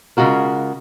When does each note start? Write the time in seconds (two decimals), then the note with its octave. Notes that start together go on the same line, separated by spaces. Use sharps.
0.17 C#3 G#3 F4 F#4 A#4